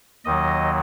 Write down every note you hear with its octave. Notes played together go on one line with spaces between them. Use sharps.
D#2 D#3 F#3 D#5